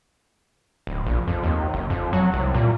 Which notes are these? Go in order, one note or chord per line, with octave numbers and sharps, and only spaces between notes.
D1
A#1
F2
D#2
F#1
F2
F#3
C2
A#2